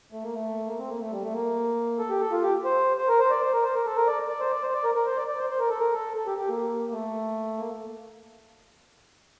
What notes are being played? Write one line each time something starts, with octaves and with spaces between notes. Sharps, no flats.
A3
A#3
A3
A#3
C4
A#3
A3
G3
A3
A#3
A4
G4
A4
F4
G4
C5
C5
A#4
C5
D5
C5
A#4
C5
A#4
A4
A#4
D5
D5
C5
D5
C5
D5
A#4
A#4
C5
D5
D5
C5
C5
A#4
A4
A#4
A4
A4
G4
G4
A#3
A3
A#3